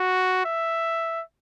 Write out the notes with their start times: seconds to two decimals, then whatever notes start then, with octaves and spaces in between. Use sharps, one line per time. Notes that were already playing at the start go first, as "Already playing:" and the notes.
Already playing: F#4
0.45 E5